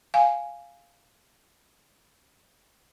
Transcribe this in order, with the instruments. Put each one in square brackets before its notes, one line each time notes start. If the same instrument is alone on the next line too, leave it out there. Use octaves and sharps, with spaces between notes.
[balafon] F5 G#5